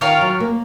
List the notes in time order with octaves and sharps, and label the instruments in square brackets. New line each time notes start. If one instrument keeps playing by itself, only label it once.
[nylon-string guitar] D#3 [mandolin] F4 A#4 C#5 F5
[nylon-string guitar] F#3
A#3